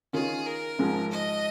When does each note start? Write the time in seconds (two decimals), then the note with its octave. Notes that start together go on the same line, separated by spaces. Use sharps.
0.13 D#3 C#4 F4 G#4
0.46 A#4
0.79 G#1 G#2 F3 G#3
1.11 D#5